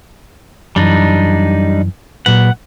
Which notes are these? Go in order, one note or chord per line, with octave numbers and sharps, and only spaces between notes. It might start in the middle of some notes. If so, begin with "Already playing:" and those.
F#2 E3 G3 D4 D#4
A#2 F#3 B4 F#5